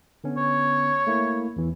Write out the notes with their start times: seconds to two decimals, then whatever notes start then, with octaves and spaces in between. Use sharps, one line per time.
0.24 D3 B3 C#4
0.37 C#5
1.07 A3 A#3 E4
1.56 E2 E3